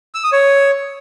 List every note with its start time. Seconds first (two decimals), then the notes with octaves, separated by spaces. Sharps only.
0.15 E6
0.23 D#6
0.32 C#5